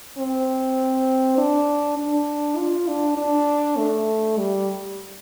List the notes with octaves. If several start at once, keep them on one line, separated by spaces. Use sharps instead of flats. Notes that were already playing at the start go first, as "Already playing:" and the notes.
C4
D4
D4
F4
D4
D4
A3
G3